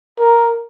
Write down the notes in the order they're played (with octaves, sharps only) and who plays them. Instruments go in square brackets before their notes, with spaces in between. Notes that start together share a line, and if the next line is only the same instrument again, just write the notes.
[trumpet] A#4